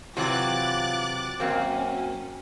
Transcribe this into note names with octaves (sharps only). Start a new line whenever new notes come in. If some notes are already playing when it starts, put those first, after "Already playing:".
C3 E3 F#3 F4 D6 F#6 A6
F#2 A#3 C4 C#4 F#4